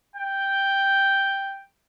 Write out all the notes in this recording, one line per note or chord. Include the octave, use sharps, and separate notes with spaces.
G5